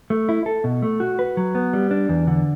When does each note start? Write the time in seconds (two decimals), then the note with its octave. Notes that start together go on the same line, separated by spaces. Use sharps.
0.10 A3
0.29 E4
0.46 A4
0.64 B2
0.82 A3
1.00 F#4
1.19 B4
1.37 F#3
1.55 B3
1.73 G3
1.91 D4
2.09 E2
2.27 D3